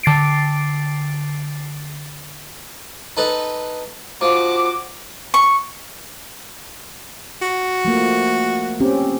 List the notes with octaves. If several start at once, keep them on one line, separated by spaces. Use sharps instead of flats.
D3 A6 C7 D7
D#4 A4 B4
F3 F#4 D6
C#6
F#4
F3 A3 A#3
C4 C#4 G4